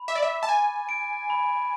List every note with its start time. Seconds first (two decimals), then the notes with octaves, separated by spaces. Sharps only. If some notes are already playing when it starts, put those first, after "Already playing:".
Already playing: B5
0.08 E5 D6
0.15 D5
0.22 E5
0.43 A5
0.49 G#5 A6
0.89 D7
1.30 B5